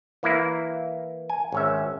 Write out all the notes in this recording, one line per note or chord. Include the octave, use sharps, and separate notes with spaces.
E3 A#3 E4
G#5
G#1 C#4 E5